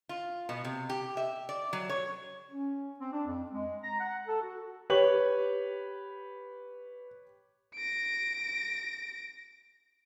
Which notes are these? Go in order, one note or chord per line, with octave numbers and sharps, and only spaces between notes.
F4
B2
C3
G4
E5
D5
F#3
C#5
C#4
C4
D4
F2
G#3
A#5
F#5
A4
F#4
G4 B4 C#5 F#7
A#6 D7